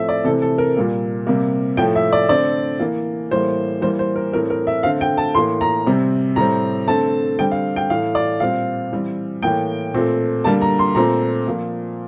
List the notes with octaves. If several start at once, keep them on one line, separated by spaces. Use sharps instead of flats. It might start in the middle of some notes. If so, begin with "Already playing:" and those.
Already playing: A2 F3 A3 C4 E5
D5
C3 E3 A3 C4 A4
A4
A#4
A#2 G3 A#3
C3 G3 A#3
A2 F3 A3 G5
E5
D5
D3 A3 C4 D5
E3 A#3
A2 E3 G3 A#3 C5
E3 G3 A#3 C5
C5
A#4
A2 E3 A3 C4 A#4
A#4
E5
D3 A3 C4 F5
G5
A5
A2 E3 A#3 C6
A#5
C3 G3 C4
A2 G3 C4 A#5
D3 A3 C4 A5
D3 G3 C4 G5
F5
G5
A2 E3 A3 F5
D5
A#2 G3 C4 F5
E3 G3 C4
A2 E3 A#3 G5
A#2 A3 C4
D3 G3 A#3 A5
A#5
C6
A#2 A3 C4 A#5
A#2 F3 A#3